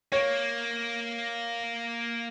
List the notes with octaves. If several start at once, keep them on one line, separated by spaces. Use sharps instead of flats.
A#3 C#5